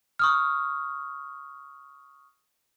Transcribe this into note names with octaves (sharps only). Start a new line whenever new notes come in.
C#6 D#6 F6